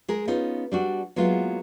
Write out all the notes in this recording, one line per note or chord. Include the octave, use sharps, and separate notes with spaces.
G#3 G#4 A#4
B3 C#4 D#4 F4
G3 D4 F#4
F#3 G#3 A#3 B3 E4 F4